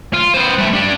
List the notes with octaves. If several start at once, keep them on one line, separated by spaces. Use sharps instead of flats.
F4
B3 C5
G3 A3
D4 G4